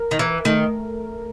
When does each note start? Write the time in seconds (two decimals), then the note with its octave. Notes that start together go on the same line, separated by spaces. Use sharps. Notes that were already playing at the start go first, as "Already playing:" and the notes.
Already playing: A#4
0.11 D#3
0.19 E3 A#4
0.45 D#3 A3